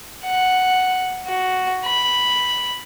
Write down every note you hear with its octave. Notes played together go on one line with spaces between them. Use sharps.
F#5
F#4
B5